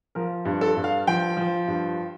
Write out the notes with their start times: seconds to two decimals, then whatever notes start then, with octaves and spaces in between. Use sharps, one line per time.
0.15 F3 A#4
0.45 G2
0.61 A4
0.77 G2
0.84 F5
1.07 F3 G5
1.37 F3
1.67 G2